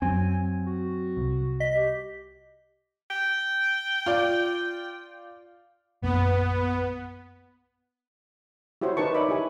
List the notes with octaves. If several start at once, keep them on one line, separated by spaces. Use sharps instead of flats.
F#2 F#3 C4 G#5
F#4
C2
D#5 B6
G4
G5
F4 D5
A#1 F#2 A#3 B3
E4 F#4 G4 C5 C#5
D#4 A#4 B4 A5 C#6
C#5 D5 E5 B5 D6
E4 G4 G#5